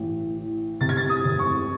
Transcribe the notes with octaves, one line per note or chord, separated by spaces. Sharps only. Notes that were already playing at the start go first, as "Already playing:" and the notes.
Already playing: A1 A2
E3
C3 A6
G#6
A6
D#6
F1
C#6